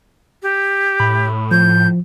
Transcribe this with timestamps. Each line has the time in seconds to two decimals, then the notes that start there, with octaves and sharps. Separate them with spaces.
0.42 G4
1.00 A2 B5
1.51 F3 G6